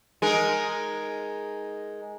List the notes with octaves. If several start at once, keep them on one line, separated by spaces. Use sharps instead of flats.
G#3 D#4 A#4